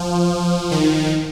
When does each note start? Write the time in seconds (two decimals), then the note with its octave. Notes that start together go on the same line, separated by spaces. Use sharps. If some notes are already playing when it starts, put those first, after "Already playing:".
Already playing: F3
0.71 D#3